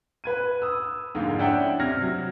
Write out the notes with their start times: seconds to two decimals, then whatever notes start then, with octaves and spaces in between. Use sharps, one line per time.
0.24 B4 G#6 D#7
0.62 D#6 E6
1.15 F2 G#2 D3 A#3
1.39 C#4 D4 E4 E5 F#5 G5
1.80 C3 F6 G#6 A#6
2.02 F#3